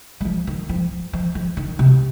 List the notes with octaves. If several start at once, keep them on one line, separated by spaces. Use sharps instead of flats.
G3
F3
D#3
F3
F3
F3
D#3
C3